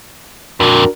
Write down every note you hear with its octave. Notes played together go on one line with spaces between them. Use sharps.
F2 A#2 D4 F#4 A#4